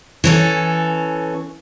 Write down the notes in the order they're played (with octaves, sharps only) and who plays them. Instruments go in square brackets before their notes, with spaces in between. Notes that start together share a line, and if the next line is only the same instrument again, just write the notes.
[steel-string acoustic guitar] E3 C#4 A4